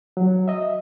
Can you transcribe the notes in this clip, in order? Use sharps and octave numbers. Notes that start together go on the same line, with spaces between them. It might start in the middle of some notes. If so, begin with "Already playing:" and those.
F#3
D#5 E5